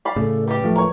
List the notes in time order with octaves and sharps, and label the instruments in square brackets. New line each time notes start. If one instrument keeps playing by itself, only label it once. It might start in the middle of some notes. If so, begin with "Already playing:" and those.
[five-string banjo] D5 F5 B5
[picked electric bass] A2 C#3 [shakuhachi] A4
[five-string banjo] G3 G4 [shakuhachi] B4
[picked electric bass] D1 F3 A3
[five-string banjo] A#4 C#5